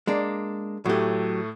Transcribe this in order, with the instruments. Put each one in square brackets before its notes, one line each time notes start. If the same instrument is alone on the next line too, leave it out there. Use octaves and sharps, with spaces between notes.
[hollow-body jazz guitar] G#3 A#3 D4
[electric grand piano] A2 A3 [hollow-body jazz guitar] F#3 G4